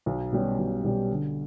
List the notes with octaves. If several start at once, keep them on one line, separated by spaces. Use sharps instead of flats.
B1
B2 G3 C#4 G4
B1
B2 G3 C#4 G4
D3